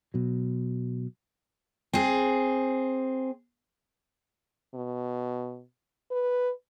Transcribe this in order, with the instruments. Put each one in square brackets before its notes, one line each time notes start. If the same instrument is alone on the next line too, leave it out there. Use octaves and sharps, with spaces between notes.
[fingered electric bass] B2 F#3
[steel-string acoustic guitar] C4 G#4
[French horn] B2
B4